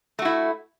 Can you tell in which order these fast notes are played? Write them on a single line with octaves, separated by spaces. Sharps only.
A3 F#4 E4